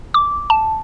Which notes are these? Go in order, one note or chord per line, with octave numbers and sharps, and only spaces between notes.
D6
A5